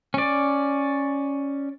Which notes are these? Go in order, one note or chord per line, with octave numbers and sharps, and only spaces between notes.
C#4 D5